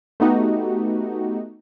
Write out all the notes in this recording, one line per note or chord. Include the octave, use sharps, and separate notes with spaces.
A3 B3 D#4 F#4 G4